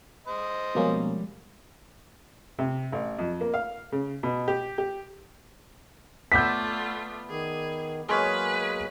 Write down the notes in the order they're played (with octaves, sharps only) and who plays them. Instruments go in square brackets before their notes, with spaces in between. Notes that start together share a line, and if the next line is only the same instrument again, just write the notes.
[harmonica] C5 D#5
[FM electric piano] B2 A#3 C#4 [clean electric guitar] F3 G3 G#3
[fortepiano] C3
A1
F2
A#3
F5
C#3
B2
G4
G4
[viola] A3 F4 [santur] B3 D5 E5 [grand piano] G6 B6
[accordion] D#3 [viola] G#4
[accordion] F#3 A#3 G#4 [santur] G#3 C#5 F5 [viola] B4